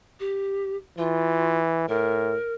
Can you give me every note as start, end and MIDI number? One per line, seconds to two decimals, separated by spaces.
0.20 0.76 67
0.98 1.84 52
0.98 1.59 65
1.88 2.36 45
1.88 2.54 70